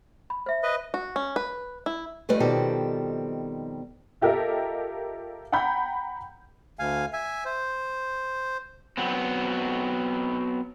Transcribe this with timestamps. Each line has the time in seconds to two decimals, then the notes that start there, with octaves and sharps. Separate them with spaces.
0.30 B5
0.46 C5 E5
0.63 B4 D#5
0.94 F#4
1.16 C#4
1.36 B4
1.86 E4
2.29 G2 F3 G3 A3 B4 D#5
2.40 B2 D#3 F3 G3 C4 A4
4.21 F4 G4 A4 A#4 D#5 E5
5.52 F#5 G5 A#5 B5 G6
6.79 D2 F5 G#5
7.13 E5 G#5
7.45 C5
8.97 F#3 B3 C4